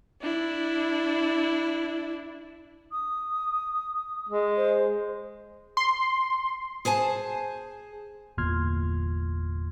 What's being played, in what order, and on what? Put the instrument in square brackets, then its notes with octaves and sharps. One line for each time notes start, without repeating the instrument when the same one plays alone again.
[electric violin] D4 E4
[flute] D#6
[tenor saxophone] G#3
[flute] C5
[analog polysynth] C6
[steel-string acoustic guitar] G#4 C5 G#5 A5
[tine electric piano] G1 E2 A#2 C6 F6 G#6